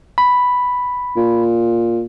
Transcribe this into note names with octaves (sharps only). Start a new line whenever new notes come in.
B5
A#2